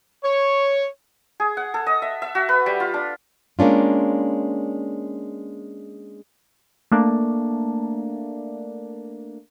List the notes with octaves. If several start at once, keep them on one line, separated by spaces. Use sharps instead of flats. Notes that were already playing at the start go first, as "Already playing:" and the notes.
C#5
G#4
F#5
A4
D#5
E5
E5
F#4
B4
G3
F4
D4
G#3 A#3 C#4 D4 F4
A3 A#3 D4